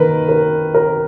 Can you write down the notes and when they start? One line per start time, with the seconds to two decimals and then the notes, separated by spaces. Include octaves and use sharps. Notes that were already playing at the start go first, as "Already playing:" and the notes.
Already playing: D#3 A#3 A#4 B4
0.29 A#4
0.75 A#4